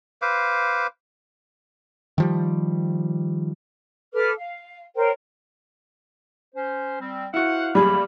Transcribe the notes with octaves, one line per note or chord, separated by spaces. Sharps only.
B4 C5 F5 D6
D#3 F3 G3
A4 B4 D6 F6
F5
A#4 C5 C#5 G5
C#4 C5
G3 C4
E4 F#4 C5 F5 F#5
F#2 D#3 G3 A3 A#3 G#4 B5